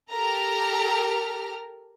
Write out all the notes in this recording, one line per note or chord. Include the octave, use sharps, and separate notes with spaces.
G4 A4 A#4 A#5 F6